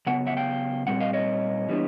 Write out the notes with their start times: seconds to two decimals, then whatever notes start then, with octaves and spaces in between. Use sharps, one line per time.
0.07 C#3 F#3 B3 F#5
0.26 E5 F#5
0.37 F5 G5
0.87 A#2 G3 C4 F#5
1.00 D#5 F5
1.13 C#5 D#5
1.69 E3 G3 B3 D4